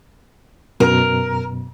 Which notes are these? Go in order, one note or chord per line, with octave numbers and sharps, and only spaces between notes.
F#2 B2 A#4